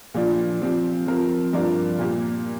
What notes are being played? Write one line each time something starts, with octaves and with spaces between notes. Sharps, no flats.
A#2 F3 D4 F4
F3 C4 G4
F3 C4 A#4
G2 F3 D4 A#4 D5
A#2 A#3 G4